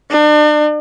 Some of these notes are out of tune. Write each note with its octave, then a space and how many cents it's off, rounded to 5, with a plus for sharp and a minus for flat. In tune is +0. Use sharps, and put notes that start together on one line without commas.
D4 +40